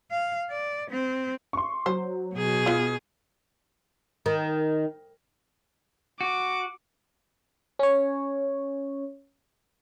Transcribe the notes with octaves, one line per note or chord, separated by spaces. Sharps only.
F5
D5
C4
C6 C#6
F#3 C5
B2 G#4
B3 F4
D#3
F#4 D6
C#4 C#5